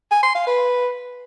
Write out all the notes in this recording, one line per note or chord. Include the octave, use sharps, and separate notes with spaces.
G#5
C6
F5
B4